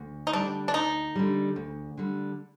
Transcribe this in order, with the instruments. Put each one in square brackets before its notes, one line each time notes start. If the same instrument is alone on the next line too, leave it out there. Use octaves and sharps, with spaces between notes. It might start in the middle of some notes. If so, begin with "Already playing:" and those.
Already playing: [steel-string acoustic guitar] D2
[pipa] D#4
[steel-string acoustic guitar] D3 G3 [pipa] D4
[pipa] D4
[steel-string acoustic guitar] D2 [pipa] D#4
[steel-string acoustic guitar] D3 G3
D2
D3 G3